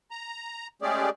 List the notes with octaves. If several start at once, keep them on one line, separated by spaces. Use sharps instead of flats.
A#5
G#3 A3 C#4 G4 G#4 D5